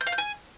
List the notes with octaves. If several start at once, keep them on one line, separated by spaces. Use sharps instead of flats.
G6
F5
G6
G#5